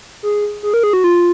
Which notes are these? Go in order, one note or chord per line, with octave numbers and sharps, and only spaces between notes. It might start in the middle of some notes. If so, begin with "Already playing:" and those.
G#4
G#4
A#4
G#4
F#4
F4